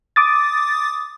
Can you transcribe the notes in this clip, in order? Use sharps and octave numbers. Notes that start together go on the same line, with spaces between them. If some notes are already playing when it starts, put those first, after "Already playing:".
D6 D#6 A6